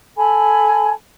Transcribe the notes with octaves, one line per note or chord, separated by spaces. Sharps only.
A4 G#5 A5 B5